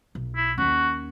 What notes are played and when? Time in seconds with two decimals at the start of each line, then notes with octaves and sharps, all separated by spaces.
0.15 B1
0.36 E4
0.58 D#2 C#4 F#4